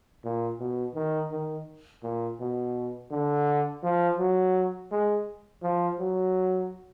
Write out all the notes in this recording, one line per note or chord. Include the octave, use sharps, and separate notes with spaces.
A#2
B2
D#3
D#3
A#2
B2
D3
F3
F#3
G#3
F3
F#3